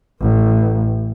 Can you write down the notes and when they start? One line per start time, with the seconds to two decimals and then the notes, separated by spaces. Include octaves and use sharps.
0.21 A1